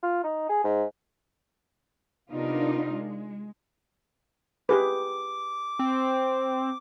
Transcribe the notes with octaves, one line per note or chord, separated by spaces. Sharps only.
F4
D#4
G#4
G#2
C3 B3 D4 D#4 F4 A#4
G#3
G4 G#4 B4 D6
C4